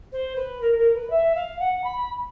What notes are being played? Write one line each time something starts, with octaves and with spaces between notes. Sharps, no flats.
C5
B4
A#4
A#4
B4
E5
F5
F#5
B5